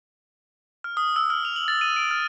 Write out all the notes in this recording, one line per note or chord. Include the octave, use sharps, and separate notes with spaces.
F6
D#6
E6
F6
F7
F#7
A6
D#7
D7
F6